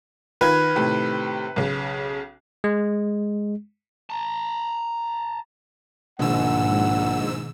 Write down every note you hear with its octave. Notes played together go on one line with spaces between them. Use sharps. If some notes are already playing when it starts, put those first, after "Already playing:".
D#3 F4 B4 G#6
A2 C3 D#3
B1 C#3
G#3
A5 A#5
A#1 G#2 B2 D#3 F#5 G#5 E6